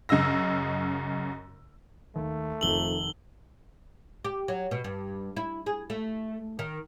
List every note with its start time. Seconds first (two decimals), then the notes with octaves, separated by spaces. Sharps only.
0.09 F#2 C#3 D#5 E6 A#6
2.16 D#2 A3
2.61 F1 F2 D#3 E6 F#7 G7
4.25 G4
4.48 F#3
4.71 B2
4.84 G2
5.37 E4
5.66 G#4
5.90 A3
6.59 D#3